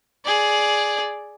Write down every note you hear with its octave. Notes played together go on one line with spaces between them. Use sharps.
G#4 D5